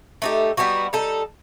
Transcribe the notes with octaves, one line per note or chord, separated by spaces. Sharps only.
A3 D#4 G4
G3 B3 D#4 F#4
G3 D#4 A4